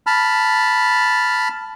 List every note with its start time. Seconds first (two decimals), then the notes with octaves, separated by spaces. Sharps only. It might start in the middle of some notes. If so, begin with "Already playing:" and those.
0.07 A5 B5 F6